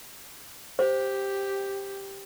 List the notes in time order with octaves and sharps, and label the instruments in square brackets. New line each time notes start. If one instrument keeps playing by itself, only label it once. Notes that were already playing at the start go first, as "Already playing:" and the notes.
[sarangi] G4 [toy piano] C5